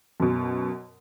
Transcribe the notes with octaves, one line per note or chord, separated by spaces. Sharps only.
F#2 B2